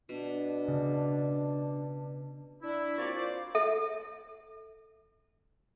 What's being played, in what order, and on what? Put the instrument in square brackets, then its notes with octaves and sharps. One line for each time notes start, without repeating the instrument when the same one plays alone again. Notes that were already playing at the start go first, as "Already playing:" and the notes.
[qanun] B2 [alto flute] D4
[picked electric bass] C#3
[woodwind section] D4 E4
A#3 C4 F4 F#4 C#5 D5
F4 C5 D5
[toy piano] A4 E5